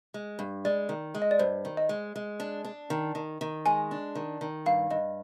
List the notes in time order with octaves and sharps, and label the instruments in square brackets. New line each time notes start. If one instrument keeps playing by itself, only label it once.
[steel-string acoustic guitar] G#3
G2
[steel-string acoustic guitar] G#3 [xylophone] D5
[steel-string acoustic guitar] D#3
G#3
[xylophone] D#5
D5
[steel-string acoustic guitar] G2 [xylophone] C5
[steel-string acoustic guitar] D#3
[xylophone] D#5
[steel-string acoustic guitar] G#3
G#3
D4
D4
D#3
D#3
D#3
[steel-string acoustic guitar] G#3 [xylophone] G#5
[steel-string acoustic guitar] D4
D#3
D#3
[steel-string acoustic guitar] G2 [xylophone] F5
[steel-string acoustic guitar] G2 [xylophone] D#5